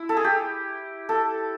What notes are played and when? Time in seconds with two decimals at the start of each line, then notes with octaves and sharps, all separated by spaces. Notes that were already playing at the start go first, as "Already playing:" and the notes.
Already playing: E4
0.09 A4
0.17 G#4
0.24 G4
1.09 A4